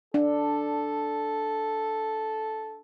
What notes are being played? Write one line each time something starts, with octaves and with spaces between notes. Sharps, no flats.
D4 A4